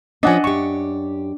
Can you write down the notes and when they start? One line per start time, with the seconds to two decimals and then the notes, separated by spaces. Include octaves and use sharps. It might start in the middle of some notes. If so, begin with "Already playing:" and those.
0.23 F3 C#4 D4 D#5 F#5 G#5
0.44 F#2 G4 C#6